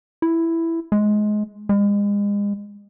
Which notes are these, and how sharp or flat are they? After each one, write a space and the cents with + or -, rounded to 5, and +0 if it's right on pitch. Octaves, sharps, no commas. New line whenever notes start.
E4 +5
G#3 +20
G#3 -35